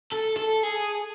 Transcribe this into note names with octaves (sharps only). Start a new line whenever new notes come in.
A4
A4
G#4